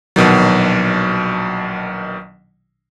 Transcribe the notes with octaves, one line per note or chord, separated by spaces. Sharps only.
A#1 B2 D#3 F#3